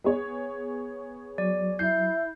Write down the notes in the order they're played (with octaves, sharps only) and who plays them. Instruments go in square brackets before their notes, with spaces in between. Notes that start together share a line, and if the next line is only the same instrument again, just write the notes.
[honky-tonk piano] B3 G#4 C#5
[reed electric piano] F#3 [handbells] D5
[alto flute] E4 [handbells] G6 [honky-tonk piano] C7